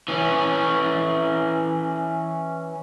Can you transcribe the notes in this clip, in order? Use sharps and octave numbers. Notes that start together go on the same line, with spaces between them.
E3 C#4